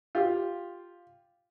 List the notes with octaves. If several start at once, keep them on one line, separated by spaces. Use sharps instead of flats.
F4 G4